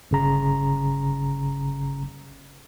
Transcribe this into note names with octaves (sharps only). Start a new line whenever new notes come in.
G1 C#3 A#5